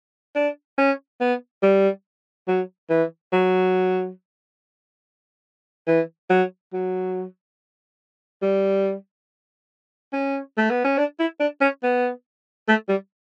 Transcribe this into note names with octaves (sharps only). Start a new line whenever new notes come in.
D4
C#4
B3
G3
F#3
E3
F#3
E3
F#3
F#3
G3
C#4
A3
B3
C#4
D4
E4
D4
C#4
B3
A3
G3